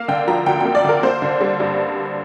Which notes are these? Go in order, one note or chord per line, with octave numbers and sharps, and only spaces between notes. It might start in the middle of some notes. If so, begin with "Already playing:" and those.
Already playing: A#3 F5
D3 G5
F3 A#5
D2 G5
A#3 G5
D5
D3 A#4
A#3 C5
D3
G3
G2